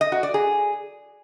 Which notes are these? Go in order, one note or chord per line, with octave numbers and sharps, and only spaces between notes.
D#5
F#4
D5
G#4